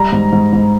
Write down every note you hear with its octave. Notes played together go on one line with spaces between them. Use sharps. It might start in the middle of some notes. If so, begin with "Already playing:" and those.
Already playing: G3 A#5
G#2
G#2
G#2